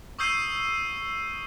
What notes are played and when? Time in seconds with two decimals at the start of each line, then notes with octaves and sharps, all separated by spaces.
0.19 C#6 D#6 E6 G6 C7 D#7